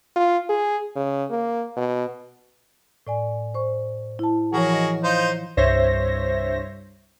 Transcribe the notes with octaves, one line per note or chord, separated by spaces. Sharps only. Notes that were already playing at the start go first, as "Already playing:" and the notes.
F4
G#4
C#3
A#3
B2
A2 D5 G#5
C5 C#6
E4 A5
E3 F3 F#4 G#4 A#4 C#5
D#5
D#4 F4 C5
C2 G2 C5 C#5 E5 A#6